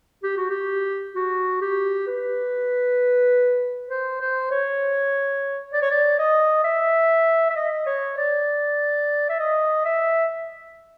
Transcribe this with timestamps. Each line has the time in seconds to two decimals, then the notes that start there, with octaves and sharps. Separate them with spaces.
0.23 G4
0.37 F#4
0.50 G4
1.15 F#4
1.61 G4
2.07 B4
3.89 C5
4.21 C5
4.51 C#5
5.73 D5
5.82 C#5
5.91 D5
6.19 D#5
6.64 E5
7.50 E5
7.56 D#5
7.86 C#5
8.17 D5
9.29 E5
9.39 D#5
9.85 E5